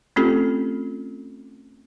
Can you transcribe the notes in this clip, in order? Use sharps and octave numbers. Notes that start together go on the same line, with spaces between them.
A3 C4 C#4 F4 G4 A4